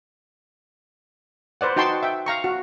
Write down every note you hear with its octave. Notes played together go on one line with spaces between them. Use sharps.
B4 C5 D5 F#5
D#4 F#4 G5 A5 C6 C#6
E5 G5
F5 A#5 C#6
F#4